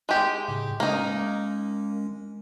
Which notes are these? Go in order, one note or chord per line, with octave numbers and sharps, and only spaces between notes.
G#3 G4
A2 C#3
G#3 A#3 C#4 D#4